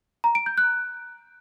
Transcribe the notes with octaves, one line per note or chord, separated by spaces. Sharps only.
A#5
D7
G6
F#6